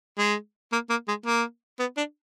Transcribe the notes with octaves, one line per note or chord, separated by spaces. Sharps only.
G#3
A#3
A#3
G#3
A#3
B3
D4